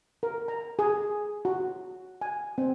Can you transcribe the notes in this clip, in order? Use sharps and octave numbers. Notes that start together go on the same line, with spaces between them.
A#4
A#5
G#4
F#4
G#5
C4